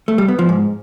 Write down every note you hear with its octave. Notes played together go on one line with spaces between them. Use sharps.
A3
G3
B3
F3
G#2